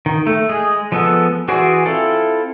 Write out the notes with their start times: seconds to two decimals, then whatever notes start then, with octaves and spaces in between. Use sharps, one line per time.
0.06 D#3
0.27 A3
0.49 G#3 G#4
0.92 F3 G#3 B3 A4
1.48 E3 F#4 G#4 C5 D5
1.86 C4 E4 F4 A4